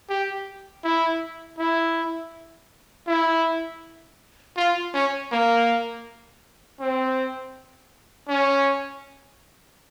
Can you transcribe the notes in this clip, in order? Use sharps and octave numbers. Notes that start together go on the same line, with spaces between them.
G4
E4
E4
E4
F4
C#4
A#3
C4
C#4